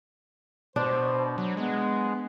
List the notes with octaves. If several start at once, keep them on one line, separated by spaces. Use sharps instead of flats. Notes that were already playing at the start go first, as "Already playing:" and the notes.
B2 D4 C5
F#3
G#3 B3